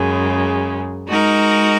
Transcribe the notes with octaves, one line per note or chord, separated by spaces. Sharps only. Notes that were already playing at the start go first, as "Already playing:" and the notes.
Already playing: F#2 C#3 G#3
G#3 D#4 F#4 A#4